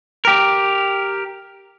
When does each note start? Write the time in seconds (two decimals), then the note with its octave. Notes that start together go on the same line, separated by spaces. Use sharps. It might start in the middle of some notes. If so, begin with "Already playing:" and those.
0.25 G4 A#4